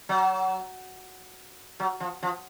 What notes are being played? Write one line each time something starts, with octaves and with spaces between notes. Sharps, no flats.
F#3
F#3
F3
F3